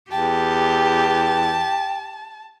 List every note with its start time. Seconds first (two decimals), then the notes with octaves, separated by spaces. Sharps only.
0.12 E2 G4 G5 A5